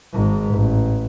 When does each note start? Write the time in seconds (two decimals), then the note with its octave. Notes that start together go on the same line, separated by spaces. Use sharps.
0.13 G#1 G#2
0.54 A1